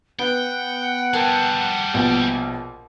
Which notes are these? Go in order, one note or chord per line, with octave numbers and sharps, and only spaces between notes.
B3 F#5 G5
G3 G#4 A#4 G5 A5
A#1 B2